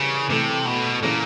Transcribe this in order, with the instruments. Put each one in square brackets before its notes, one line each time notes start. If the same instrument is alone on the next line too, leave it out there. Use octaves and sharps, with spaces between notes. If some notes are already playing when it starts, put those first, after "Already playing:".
Already playing: [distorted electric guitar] C#3 [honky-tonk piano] E3 G3 A#3
[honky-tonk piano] A2 E3 A3 [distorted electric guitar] C3
[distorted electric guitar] B2
[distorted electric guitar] A#2 [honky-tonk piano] C#3 E3 A3